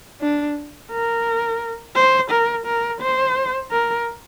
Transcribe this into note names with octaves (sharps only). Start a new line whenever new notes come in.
D4
A#4
C5
A#4
A#4
C5
A#4